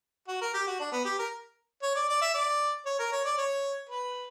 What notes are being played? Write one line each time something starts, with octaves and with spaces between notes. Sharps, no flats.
F#4
A#4
G4
F#4
D4
B3
G4
A#4
C#5
D5
D5
E5
D5
C#5
A#4
C#5
D5
C#5
B4